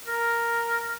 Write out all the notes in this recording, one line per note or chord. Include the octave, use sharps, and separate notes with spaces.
A#4